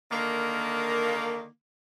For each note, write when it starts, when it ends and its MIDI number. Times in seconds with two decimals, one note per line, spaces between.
0.11 1.46 50
0.11 1.46 51
0.11 1.46 58